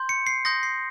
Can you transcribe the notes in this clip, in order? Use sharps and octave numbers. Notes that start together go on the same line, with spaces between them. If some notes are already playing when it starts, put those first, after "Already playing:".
Already playing: C6 G6
C#7
C7
C6 D#6 G6 A#6
C7